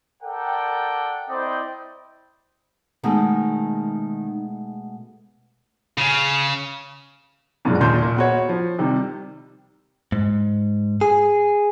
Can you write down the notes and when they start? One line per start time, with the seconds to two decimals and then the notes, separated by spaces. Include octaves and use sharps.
0.23 A4 A#4 D5 F#5 G5
1.30 C4 E4 C5 D5 D#5 G5
3.03 B2 D#3 G#3 A3
5.98 C#3
7.65 F#2 B2 F#3 G#3 D4 F4
7.80 D#2 A#2 D#4 C6 G6
8.02 A#2
8.16 B3 F#4 C#5
8.49 F3
8.79 C3 D#3 G3
10.12 G#2
11.01 G#4